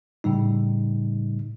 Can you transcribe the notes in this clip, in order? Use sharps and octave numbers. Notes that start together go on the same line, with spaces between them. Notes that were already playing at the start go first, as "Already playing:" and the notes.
A2 C#3 G3 D#4